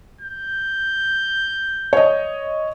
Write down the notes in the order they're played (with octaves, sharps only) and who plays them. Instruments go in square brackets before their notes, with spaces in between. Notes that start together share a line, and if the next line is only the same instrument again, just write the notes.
[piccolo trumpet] G6
[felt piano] C#5 D#5